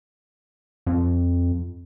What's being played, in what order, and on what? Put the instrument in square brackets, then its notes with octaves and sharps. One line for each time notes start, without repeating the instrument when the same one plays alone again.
[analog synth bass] F2